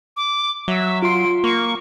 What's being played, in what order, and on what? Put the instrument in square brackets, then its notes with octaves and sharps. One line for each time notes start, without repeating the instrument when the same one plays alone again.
[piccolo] D6
[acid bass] F#3 [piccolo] E5
[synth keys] F4 C6 [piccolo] D7
[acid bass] A#3 [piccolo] C#6